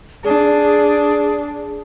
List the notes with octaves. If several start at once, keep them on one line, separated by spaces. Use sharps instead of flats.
D4 G#4